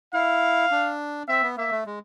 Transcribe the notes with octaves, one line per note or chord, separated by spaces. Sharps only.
E4 F5
D4
C4 E5
B3
A#3 E5
A3
G#3